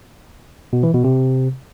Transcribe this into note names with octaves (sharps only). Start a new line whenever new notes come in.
B2
E3
B2
C3